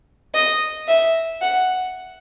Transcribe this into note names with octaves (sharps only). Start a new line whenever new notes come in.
D#5
E5
F#5